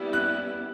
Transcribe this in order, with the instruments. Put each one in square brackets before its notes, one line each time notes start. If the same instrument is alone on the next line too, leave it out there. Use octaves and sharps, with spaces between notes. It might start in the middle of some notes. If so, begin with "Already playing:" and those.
Already playing: [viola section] G3 B3 E4
[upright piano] F#6